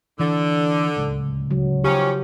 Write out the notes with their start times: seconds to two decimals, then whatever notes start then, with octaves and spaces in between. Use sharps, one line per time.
0.19 D3 E3
0.96 D1 C#2
1.51 C#3 F#3
1.84 D#3 F3 C#4 G4